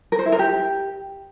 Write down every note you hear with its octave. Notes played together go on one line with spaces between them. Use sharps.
A#4
C5
E4
A#4
G4